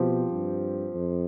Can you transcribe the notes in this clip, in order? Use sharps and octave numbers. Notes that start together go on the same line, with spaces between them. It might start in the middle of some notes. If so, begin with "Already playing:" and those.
Already playing: B2 F3 C4 G4
G2
F2